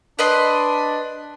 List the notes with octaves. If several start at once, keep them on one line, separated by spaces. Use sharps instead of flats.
D4 B4 D#5 C6